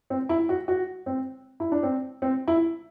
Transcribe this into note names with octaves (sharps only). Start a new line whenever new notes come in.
C4
E4
F#4
F#4
C4
E4
D4
C4
C4
E4